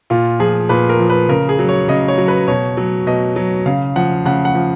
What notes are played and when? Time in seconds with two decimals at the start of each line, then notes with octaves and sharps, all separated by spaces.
0.10 A#2 F4
0.39 F3 G#4
0.69 A#2 B4
0.89 A#4
1.00 F3
1.10 B4
1.29 C#3 A#4
1.49 G#4
1.59 F#3
1.69 C#5
1.88 C#3 D#5
2.08 C#5
2.18 F#3
2.28 B4
2.48 B2 C#5
2.77 F#3
3.07 B2 D#5
3.36 F#3
3.66 C#3 F5
3.96 F3 F#5
4.25 C#3 F#5
4.45 F#5
4.55 F3